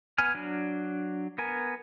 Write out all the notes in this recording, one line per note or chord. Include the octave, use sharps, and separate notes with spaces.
B3 G#5 F6
F#3 D4
B3 A#4 G#5